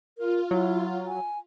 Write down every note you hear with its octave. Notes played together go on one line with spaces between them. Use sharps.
F4 A#4
F#3 E4
G#5